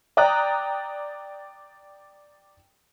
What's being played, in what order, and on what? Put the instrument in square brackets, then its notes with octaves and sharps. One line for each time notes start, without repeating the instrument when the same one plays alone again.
[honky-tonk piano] D5 G5 A#5 D#6 F#6